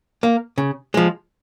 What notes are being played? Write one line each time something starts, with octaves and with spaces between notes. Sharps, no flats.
A#3
C#3
F3 G#3